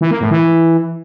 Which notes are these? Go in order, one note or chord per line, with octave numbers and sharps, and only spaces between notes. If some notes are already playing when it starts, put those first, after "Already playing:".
E3
A#3
A2
E3